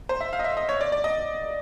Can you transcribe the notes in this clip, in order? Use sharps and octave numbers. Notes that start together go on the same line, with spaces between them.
C5
E5
F5
D#5
E5
D#5
C#5
D5
D5
D#5